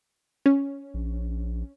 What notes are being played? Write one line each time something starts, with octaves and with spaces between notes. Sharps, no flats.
C#4
A#1